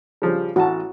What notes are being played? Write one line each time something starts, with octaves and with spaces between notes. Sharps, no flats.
C#3 F3 G3
A1 F#4 A5